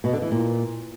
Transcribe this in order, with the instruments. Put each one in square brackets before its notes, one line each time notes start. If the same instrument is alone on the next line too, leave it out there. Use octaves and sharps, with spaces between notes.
[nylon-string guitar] B2
D3
E3
A#2